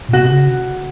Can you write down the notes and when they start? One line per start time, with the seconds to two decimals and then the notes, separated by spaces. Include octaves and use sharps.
0.09 A#2
0.13 C3 F#4
0.31 C#3